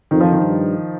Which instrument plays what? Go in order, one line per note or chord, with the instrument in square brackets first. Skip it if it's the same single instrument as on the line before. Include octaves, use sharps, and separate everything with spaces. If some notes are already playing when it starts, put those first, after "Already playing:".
[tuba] F2 [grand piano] D#3
[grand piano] F3
D#3
[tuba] G2